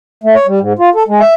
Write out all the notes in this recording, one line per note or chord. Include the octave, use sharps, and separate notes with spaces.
A3
C#5
G3
G#2
F4
A4
G#3
E5